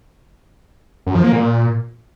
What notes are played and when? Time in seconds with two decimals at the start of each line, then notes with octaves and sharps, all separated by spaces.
1.06 F#2
1.15 F3
1.24 A#3
1.33 A#2